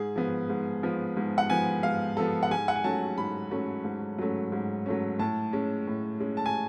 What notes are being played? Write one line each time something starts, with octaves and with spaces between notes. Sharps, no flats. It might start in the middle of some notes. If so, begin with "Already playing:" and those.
Already playing: G#2 G#4
F3 B3
G#2
F3 B3
G#2
F#5
F3 B3 G#5
G#2 F5
F3 B3 A4
F#5
G#2 G#5
F#5
G#5
F#3 A3 C#4 A5
G#2 B5
F#3 A3 C#4
G#2
F#3 A3 C#4
G#2
F#3 A3 C#4
A2 A5
G#3 C#4
A2
G#3 C#4
A5
G#5